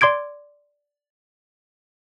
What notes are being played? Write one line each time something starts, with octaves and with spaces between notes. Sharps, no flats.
D5 C6 D6 G#6 D7